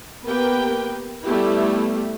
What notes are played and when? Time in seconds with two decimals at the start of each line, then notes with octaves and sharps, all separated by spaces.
0.25 A#3 B3 G4 A#4 B4 G5
1.25 G3 A3 B3 E4 G4